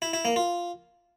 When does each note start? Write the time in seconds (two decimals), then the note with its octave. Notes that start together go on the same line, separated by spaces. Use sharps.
0.02 E4
0.13 E4
0.25 A#3
0.36 F4